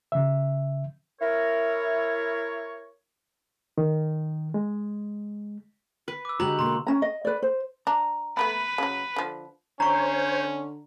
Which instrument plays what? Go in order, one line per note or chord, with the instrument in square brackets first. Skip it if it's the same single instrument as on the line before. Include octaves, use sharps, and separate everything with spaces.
[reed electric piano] C#3 E5
[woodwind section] E4 A#4 C#5
[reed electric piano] D#3
G#3
[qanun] B4
[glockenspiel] D6 E6
[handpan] D3 G#3 G4 [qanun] F#4 [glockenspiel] A#5 F#7
[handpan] B2 A#3 [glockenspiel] A#5 [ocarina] C6
[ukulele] C#4 A#5
D#5
B4 D5
C5
[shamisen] D4 [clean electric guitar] A#5
[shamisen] A3 B3 B5 [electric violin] B4
[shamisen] C#3 F#3
D3 F3
[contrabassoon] D3 [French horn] C#4 [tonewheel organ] C5 C#5 [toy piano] A#5 C#6